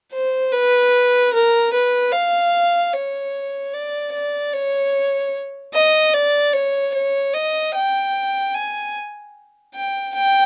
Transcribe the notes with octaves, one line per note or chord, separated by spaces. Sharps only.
C5
B4
A#4
B4
F5
C#5
D5
D5
C#5
D#5
D5
C#5
C#5
D#5
G5
G#5
G5
G5